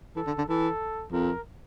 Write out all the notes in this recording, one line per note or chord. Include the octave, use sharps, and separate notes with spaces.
E3 A4
D3
D3
E3 A4
F2 A#4